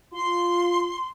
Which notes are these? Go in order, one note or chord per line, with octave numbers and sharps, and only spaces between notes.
F4 C6